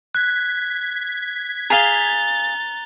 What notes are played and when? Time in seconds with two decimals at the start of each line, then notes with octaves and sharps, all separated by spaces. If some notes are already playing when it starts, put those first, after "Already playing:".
0.15 F#6 G#6 B6
1.70 G#4 F5 A#5 A6 F7 G7